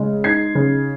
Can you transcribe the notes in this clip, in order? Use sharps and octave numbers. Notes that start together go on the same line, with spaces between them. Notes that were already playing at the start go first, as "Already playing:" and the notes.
Already playing: C#3 G#3
D#4 G#6 C7
C#3